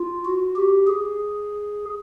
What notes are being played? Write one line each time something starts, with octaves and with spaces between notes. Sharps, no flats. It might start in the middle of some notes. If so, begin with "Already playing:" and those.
Already playing: F4
F#4
G4
G#4